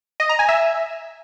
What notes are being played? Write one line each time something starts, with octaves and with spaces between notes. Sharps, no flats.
D#5
A#5
G#5
E5